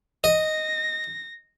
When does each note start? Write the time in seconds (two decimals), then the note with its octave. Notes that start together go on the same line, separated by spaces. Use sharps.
0.24 D#5 A#6